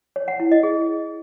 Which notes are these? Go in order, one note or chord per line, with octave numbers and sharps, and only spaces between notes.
C#5
F#5
E4
D#5
G#4